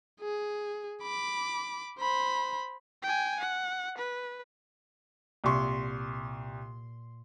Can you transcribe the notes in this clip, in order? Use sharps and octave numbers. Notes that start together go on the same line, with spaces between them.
G#4
B5 D6
C5 B5
G5 G#5
F#5
B4
C2 A#2 C6 C#6